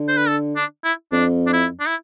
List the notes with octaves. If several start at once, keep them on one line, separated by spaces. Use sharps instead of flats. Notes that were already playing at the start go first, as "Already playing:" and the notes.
Already playing: D3
C5
B4
A4
D4
E4
F2 D4
D4
E4
D4
E4